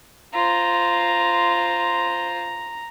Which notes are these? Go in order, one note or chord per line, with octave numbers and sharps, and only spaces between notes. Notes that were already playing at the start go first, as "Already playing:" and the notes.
F4 C5 A#5